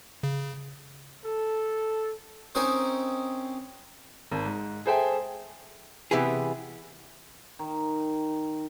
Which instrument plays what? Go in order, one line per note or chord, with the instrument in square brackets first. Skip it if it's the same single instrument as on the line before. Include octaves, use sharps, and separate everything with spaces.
[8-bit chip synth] C#3
[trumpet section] A4
[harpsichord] C4 C#4 D#4 A#4 C5
[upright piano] G#1
G#2
G#4 A4 C5 E5 G5 G#5
[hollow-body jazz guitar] C3 E3 B3 G4 G#4
[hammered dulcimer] D#3